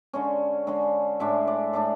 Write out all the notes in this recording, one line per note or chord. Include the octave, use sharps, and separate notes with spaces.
D3 G#3 C#4 C#5
D3 G#3 C#4
A2 G#3 D4 E5
D5
A2 G#3 D4